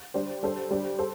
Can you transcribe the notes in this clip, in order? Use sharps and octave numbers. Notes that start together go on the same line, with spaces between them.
G3 D4 G4 C5
G3 D4 A4 C5
G3 D4 C5
A4 C5